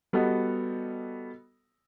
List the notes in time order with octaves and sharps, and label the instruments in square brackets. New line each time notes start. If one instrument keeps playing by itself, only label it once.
[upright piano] G3 B3 F#4 A4 D#5